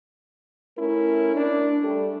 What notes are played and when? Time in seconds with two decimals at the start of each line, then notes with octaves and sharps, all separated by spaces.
0.78 A3 C#4 E4 A#4
1.35 D4
1.82 G3 A3